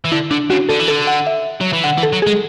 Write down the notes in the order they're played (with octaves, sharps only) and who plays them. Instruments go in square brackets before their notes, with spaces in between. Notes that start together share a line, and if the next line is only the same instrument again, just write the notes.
[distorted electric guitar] E3
[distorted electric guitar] D3 [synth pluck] E4
[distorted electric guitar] D3 [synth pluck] D4
[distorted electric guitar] C#3 [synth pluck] F#4
[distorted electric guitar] D3 [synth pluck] A4
[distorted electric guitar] E3
[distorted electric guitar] D3 [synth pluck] A4
[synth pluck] F#5
E5
[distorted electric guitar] F#3
E3
[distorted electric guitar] D3 [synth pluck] F#5
[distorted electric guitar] E3
[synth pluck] A4
[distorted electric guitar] F#3
[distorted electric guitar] G#3 [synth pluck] G#4